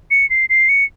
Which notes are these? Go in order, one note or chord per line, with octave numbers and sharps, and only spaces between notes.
C#7
C7
C7
C#7